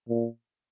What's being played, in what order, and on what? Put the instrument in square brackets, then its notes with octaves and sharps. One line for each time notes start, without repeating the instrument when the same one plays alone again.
[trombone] A#2